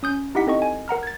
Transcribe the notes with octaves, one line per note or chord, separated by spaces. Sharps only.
C#4 D#6 G6
D#4 E4 G4 F#5 B6
C4 A4 D#5 C#6
G#5
A#4 F#5 A#5 F6
G#6 A6